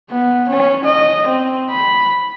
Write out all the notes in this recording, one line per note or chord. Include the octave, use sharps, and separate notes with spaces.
B3
C#4
D#5
C4
B5